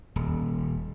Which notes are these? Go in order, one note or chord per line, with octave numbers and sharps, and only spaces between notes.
D#1